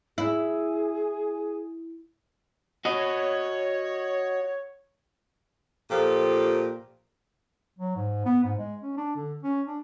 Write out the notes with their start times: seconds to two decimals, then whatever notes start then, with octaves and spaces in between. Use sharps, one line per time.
0.18 E4 G#4
2.85 F#4 C#5 D#5
5.90 A#2 F3 G4 A4
7.79 F#3
7.96 G#2
8.25 B3
8.44 G#2
8.59 G#3
8.83 C#4
8.97 D4
9.16 D3
9.43 C#4
9.67 D4